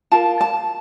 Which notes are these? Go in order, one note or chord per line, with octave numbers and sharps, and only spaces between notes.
F4 A#4 A5
A5